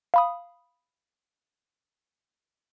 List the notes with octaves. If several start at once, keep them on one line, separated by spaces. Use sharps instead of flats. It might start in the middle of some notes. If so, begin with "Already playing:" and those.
F5 B5 D#6